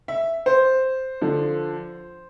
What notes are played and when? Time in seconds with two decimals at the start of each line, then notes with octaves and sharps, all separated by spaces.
0.08 E5
0.46 C5
1.21 D3 F3